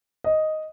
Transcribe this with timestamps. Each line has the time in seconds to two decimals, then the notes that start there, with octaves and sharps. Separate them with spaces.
0.24 D#5